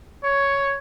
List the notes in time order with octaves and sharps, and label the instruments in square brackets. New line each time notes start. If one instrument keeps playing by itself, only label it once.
[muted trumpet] C#5